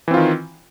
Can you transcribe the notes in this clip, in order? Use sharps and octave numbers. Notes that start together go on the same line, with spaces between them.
D#3 E3 C4 F4